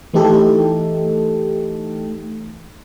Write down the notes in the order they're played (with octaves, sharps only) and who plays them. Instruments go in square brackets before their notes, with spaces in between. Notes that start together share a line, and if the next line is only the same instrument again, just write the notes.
[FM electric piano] E3 A3 D#4 G4 A4